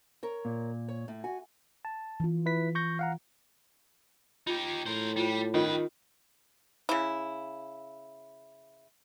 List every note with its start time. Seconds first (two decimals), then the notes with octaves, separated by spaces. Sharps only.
0.23 A#4 C#5
0.45 A#2
0.89 C#5
1.08 A2
1.24 F#4 G#5
1.85 A5
2.20 E3 F4
2.46 E4 B4 B6
2.75 C#6 G6 A#6
2.99 F5 F#5 A#5
4.47 D#4 F4 G4
4.86 A2 A#4 C5
5.16 G3 E4 F4 C5
5.54 G2 D#3 C#4 F4 B4
6.89 C#3 E4